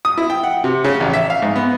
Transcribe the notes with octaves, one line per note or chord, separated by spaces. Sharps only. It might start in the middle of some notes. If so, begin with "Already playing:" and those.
D#6
E4
G5
F#5
C3
C#3
A1
E5
F5
G#2
B3